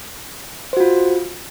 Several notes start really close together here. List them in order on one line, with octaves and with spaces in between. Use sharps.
C5 F#4 F4